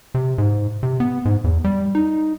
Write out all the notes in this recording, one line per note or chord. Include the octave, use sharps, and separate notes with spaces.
C3
G#2
C3
B3
G#2
E2
G3
D#4